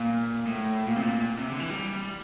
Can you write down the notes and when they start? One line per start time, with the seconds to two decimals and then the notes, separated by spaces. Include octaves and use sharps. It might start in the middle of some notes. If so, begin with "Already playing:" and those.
Already playing: A#2
0.47 A2
0.88 A#2
0.96 C3
1.02 A#2
1.39 C3
1.50 D3
1.60 E3
1.70 G3